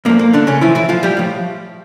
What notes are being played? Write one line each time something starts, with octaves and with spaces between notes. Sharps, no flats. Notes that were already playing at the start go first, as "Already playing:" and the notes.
G2 F3 A#3
A#3
D3 D4
C#3 C#4
A2 E3 F3 E4
E3 E4
F3 F4
G3 G4
A2 F3